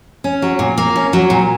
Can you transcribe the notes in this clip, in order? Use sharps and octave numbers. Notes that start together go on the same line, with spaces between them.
C#4
F#3
A#2
A#3
C#4
F#3
A#2